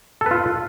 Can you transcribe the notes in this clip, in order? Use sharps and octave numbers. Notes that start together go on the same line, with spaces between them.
F4 A4 B4